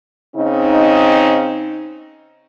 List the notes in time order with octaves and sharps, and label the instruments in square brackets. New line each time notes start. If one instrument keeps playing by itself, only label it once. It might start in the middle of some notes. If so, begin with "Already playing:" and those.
[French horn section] C#3 C4 D#4